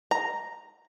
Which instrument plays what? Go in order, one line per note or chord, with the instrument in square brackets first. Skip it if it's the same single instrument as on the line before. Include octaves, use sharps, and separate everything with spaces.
[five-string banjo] A#5